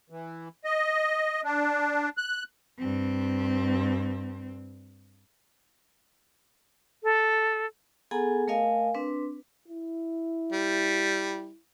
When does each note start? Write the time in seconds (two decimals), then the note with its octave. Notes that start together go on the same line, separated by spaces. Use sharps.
0.10 E3
0.64 D#5
1.44 D4
2.17 F#6
2.79 G2 C4
7.03 A4
8.11 B3 G#4 A4 F#5 G#5 A#5
8.48 A3 A#4 D#5 F5 G#5
8.95 C4 D4 B4
9.68 E4
10.53 G3